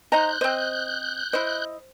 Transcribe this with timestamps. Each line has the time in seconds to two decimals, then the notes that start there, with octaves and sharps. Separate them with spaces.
0.12 D#4 C5 D#5 A#5 F#6 G6
0.41 C4 C5 D#5
1.33 E4 C5 D#5